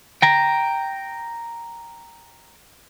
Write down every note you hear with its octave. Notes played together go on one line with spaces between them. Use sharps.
G5 A#5